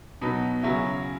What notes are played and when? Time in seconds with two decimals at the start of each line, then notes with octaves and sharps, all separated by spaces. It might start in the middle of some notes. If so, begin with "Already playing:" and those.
0.21 B2 F#3 B3 D#4
0.63 C#3 F#3 C#4 E4